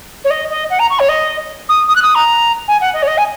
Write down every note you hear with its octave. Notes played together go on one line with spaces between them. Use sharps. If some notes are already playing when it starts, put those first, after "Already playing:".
C#5
D#5
D#5
F#5
A#5
C#6
C#5
D#5
D#6
D#6
F#6
D#6
A#5
G#5
F#5
D#5
C#5
D#5
G#5